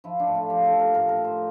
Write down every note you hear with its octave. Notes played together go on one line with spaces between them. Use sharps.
F3 E4
D4
A2
F4
F3 G4
A4
F3
A#4
A2 A#4
A#4
F3
C5